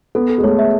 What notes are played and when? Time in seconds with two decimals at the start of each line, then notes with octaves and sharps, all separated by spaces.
0.15 B3 A4
0.30 A4
0.38 G#3
0.44 A3 C#5
0.59 E5